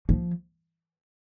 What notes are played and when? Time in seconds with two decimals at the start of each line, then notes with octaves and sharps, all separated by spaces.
0.09 F3